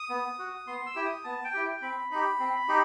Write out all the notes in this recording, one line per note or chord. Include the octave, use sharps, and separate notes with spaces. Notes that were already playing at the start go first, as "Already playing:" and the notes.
Already playing: D#6
B3
F#4
B3 C6
E6
E4 G4
D#6
B3 A5
G5
E4 G4
G5
C4 B5
D#4 G4
C4
D#4 G4